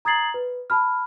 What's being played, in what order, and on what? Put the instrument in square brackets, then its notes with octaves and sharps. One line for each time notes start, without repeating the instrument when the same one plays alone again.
[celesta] A#5 D#6 G#6 A6 C7 F#7
B4
A5 B5 F6